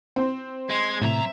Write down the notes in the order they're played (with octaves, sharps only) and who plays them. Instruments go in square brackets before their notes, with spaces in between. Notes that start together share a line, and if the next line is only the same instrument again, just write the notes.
[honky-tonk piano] C4 C5
[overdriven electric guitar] G#3 [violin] C6 G#6
[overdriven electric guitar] F#2 A#5 [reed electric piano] A2 C3 [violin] E5